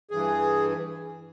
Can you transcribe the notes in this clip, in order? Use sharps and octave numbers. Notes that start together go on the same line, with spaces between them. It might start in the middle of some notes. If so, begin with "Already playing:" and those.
G2 E3 G#4